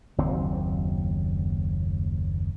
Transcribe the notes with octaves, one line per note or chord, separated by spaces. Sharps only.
F#1 D#2 F#3 C4